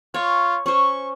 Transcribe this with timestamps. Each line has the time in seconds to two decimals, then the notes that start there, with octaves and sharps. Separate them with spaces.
0.14 F4 C#5
0.66 C#4 C5 C#6